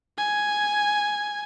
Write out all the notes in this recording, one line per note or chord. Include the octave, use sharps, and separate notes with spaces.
G#5